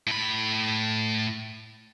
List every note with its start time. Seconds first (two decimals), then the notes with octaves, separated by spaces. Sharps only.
0.07 A2 B5